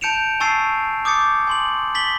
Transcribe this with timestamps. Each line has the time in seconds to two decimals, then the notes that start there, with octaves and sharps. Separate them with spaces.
0.01 A5 G6 C#7 D7 E7 F7
0.40 G#5 A5 C#6 E6 A6 C7
1.05 D6 D#6 G6 A6 C#7
1.47 G#5 C6 F#7
1.95 A6 B6 F#7 G7